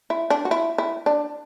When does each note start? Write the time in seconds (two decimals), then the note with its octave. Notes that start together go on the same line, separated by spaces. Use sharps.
0.10 E4
0.30 D4
0.45 F#4
0.51 E4
0.78 E4
1.06 D4